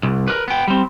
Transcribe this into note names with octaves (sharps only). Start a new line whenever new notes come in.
C2
A#4 B4
B3 G5
G3 C4